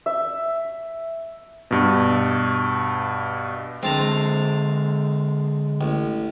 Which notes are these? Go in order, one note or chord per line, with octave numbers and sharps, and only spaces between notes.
E5
G2 B2
D3 G#3 C4 A5 A#5
A1